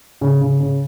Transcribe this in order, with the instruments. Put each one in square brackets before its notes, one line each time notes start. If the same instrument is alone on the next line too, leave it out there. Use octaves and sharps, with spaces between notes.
[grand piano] C#3
C#3
C#3